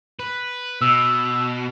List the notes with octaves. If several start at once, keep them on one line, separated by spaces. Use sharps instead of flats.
B4
B2 E6